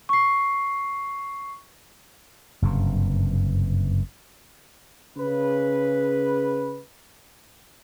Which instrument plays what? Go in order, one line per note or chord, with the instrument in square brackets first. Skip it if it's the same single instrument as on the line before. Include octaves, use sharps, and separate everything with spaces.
[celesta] C#6 C7
[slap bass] F#1 G2 C3
[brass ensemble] C#3 B4